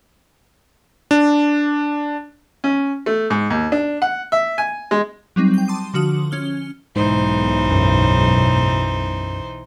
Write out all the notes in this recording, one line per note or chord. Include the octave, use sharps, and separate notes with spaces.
D4
C#4
A3
G#2
D#2
D4
F#5
E5
G#5
G#3
F#3 G3 C4 D#4
G5 G6
A5 C6 D6 D#6 D#7
D3 F3 F#4 D#6
C#4 F6 G7
B1 G#2 E3 D#4 C5
F#2